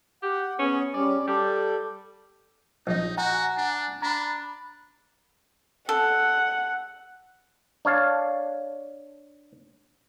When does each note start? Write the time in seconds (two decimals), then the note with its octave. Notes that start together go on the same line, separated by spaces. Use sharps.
0.23 G4 F#5
0.59 B3 C#4 G#4
0.94 G3 C#4 D5
1.28 G3 A4
2.87 A#1 D#4 D#5
3.17 F#4 F#5 G#5 A#5
3.57 D4
4.02 D4 A#5 B5
5.89 A4 F#5
7.85 D4 C#5 F5 A5